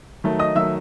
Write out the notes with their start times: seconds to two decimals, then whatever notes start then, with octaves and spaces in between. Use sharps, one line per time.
0.24 D#3 F#3 A3
0.39 D#5 D#6
0.55 D#3 F#3 A3 E5 E6